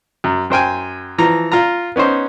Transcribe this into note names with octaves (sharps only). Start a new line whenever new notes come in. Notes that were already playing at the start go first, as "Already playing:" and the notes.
F#2
F#2 C5 G5 G#5
E3 F3 A#5
F4 A#5
B3 C#4 D#4 C5